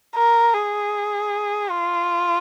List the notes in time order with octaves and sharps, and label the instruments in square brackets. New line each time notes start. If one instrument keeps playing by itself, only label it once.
[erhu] A#4
G#4
F4